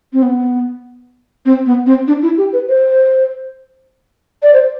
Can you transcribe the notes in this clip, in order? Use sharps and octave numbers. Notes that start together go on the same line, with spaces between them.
C4
B3
C4
B3
C4
D4
E4
G4
B4
C5
D5
C5